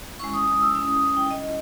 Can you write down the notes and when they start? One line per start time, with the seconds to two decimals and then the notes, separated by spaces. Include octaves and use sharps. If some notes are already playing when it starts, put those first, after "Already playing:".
0.20 G#3 C#4 E4 C#6
0.34 D#6
0.48 D#6
0.61 E6
0.75 G#3 C#4 E4 D#6
0.89 D#6
1.02 D#6
1.17 G5
1.31 G3 C#4 E4 D#5